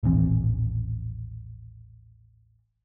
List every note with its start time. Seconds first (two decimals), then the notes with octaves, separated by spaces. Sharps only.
0.03 D#1 A1 E3 C4